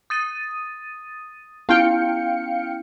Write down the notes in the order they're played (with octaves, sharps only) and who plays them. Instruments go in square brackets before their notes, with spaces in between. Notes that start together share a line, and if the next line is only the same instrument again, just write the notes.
[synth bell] D#6 A6 D#7
[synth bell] B3 C#4 E4 [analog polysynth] F5 G5 C#7